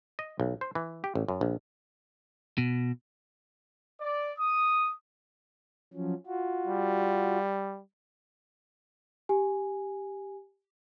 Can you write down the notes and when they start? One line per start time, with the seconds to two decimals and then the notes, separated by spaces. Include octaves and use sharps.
0.19 D#5
0.40 B1
0.61 C5
0.75 E3
1.04 G4
1.15 A1
1.28 F#2
1.41 A#1
2.58 B2
4.00 D5
4.39 D#6
5.94 F3 F#3 C#4
6.27 F4 F#4
6.67 G3
9.29 G4 G#5